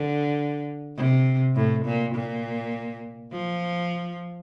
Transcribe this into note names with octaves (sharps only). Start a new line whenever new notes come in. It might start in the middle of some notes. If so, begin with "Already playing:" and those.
Already playing: D3
C3
A2
A#2
A#2
F3